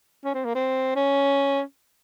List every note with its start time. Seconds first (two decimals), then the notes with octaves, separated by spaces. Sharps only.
0.25 C#4
0.34 C4
0.45 A#3
0.55 C4
0.96 C#4